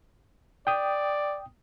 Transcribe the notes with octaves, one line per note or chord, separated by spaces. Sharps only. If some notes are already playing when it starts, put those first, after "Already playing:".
D5 G5 D#6